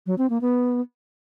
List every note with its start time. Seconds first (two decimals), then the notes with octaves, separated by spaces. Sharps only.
0.06 F#3
0.18 C4
0.30 A#3
0.41 B3